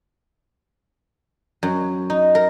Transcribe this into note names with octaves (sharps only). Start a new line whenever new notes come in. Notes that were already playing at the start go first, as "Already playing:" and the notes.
F#2
D#4
A#4